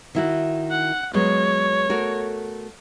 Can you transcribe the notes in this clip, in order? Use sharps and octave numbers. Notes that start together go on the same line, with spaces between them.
D#3 E4 F#4
F#5
F#3 G#3 B3 C#5
A3 F#4 A#4